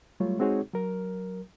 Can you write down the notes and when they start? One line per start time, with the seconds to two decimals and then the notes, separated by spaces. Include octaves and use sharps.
0.20 F#3 G3 A3 F4 C#5
0.39 G#3 C4 D#4 F#4 G#4 C#5
0.73 F#3 A#4